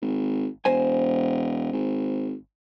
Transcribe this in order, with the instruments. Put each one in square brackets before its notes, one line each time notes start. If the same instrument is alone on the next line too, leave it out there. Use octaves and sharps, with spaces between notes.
[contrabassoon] G#1
[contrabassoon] E1 [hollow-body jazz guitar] C5 G#5
[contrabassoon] G#1